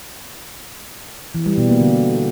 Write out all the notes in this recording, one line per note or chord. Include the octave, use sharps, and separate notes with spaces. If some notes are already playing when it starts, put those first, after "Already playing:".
E3
G3
B2
A#3
D3